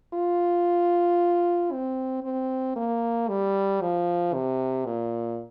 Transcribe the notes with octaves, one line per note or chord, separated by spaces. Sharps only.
F4
C4
C4
A#3
G3
F3
C3
A#2